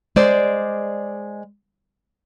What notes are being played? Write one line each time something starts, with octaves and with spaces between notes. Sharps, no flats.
G#3 C5 D5